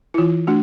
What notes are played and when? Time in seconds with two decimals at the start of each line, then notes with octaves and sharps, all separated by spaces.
0.14 E4
0.18 E3 F4
0.47 A3 D4 F#4